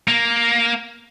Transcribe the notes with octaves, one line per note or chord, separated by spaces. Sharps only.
A#3